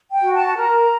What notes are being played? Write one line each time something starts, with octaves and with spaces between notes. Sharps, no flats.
G5
F#4
A5
A#4 A#5